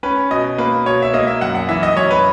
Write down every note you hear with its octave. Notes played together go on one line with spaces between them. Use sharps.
C#4 B4
B2 D#5
A#3 B4
B2 C#5
E5
A#3 D#5
E5
F#2 F#5
F#5
E3 E5
D#5
F#2 C#5
B4